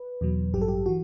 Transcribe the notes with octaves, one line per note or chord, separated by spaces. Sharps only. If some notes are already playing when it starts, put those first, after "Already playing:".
Already playing: B4
E2 B2 F#3
A1 G2 F#3 G4
A4
G4
E3 F#4